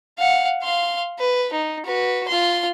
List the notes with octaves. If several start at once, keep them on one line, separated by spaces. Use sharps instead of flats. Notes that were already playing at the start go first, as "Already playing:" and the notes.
F5 F#5
F5 C6
B4
D#4
F#4 B4
F4 C6